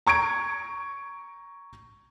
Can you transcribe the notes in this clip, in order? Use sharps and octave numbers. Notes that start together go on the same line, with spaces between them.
A#5 C#6 G#6 D7